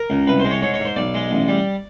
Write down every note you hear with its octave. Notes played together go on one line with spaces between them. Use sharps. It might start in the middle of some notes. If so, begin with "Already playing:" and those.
Already playing: A#4
C#2
C2 B4
G#3 C5
C#5
G#2 C#5
C#5
G#2
C5
B1 D5
G#3
A1
G3